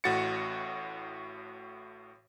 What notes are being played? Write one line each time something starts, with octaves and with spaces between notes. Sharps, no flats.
A1 A2 F#4 A6 C#7